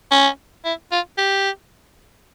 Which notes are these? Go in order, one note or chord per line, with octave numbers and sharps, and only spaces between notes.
C#4
E4
F4
G4